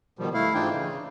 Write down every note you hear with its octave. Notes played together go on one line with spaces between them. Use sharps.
B2 D#3 F3 G3
A3 E4 F5
G#2 E3 D4 D#4 F4 G5
C#3